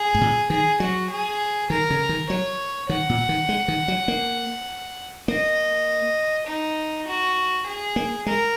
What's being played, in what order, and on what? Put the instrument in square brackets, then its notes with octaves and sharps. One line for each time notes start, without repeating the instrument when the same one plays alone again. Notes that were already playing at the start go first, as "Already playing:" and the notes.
Already playing: [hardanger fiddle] G#4
[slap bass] G#2
A#2
[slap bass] D#3 [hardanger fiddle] G#4
[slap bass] F#3 [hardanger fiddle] F#4
[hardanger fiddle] G#4
[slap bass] D#3 [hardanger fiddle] A#4
[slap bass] C#3
D#3
[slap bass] F#3 [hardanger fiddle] C#5
[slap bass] D#3 [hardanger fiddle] F#5
[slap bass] A#2
D#3
G#3
D#3
F#3
A#3
[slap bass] A#3 [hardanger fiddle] D#5
[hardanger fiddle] D#4
F#4
G#4
[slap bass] A#3
[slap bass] G#3 [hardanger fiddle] A#4